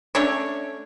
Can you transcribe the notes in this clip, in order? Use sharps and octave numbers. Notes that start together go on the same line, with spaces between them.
A3 C#4 D4 C#5